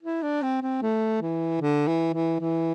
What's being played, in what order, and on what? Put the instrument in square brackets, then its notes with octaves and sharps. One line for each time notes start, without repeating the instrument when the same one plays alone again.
[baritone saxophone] E4
D4
C4
C4
A3
E3
D3
E3
E3
E3